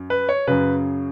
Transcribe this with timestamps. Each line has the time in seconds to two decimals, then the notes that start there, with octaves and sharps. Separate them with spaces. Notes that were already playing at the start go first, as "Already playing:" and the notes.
Already playing: F#2
0.10 B4
0.29 C#5
0.47 F#2 C#3 B4